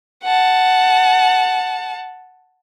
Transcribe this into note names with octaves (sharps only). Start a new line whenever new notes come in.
F#5 A5